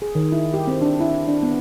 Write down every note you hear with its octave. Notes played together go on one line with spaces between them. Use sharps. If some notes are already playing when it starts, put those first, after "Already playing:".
G#4
D#3
E4
G4
C4
D4
E4
D4
B3